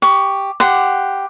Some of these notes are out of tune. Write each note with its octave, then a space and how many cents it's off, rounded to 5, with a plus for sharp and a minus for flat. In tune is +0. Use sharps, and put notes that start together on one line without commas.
G4 +5 C#6 +15
G4 +0 F#5 +0 C6 -20